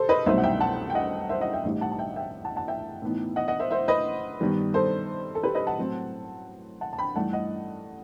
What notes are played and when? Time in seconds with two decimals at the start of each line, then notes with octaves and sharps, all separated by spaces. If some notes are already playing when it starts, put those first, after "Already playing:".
Already playing: G4 A4 C5
0.09 B4 D#5
0.26 C2 B2 F#3 A3 D#4 C5 E5
0.38 F#5
0.44 E5 G5
0.60 F#5 A5
0.90 G5
0.95 D#5 F#5
1.29 C5 E5
1.41 D#5 F#5
1.53 E5 G5
1.64 A1 A2 G3 D#4
1.81 F#5 A5
1.92 A5
1.99 E5 G5
2.16 E5 G5
2.45 F#5 A5
2.56 F#5 A5
2.68 E5 G5
3.02 A2 E3 B3 D#4
3.36 D#5 F#5
3.48 D#5 F#5
3.60 C5 E5
3.71 C5 E5
3.88 B4 D#5
4.40 G2 D#3 G3 B3
4.74 A4 C5
5.35 A4
5.43 G4 B4
5.55 B4 D#5
5.67 F#5 A5
5.78 A2 F#3 C4
6.81 F#5 A5
6.93 A5
6.98 G5 B5
7.16 G2 E3 A3 D#4 F#5 A5
7.33 D#5 F#5